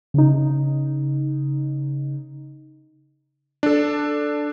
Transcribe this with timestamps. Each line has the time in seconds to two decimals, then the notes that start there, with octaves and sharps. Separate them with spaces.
0.14 C#3 D#4
3.63 D4 A4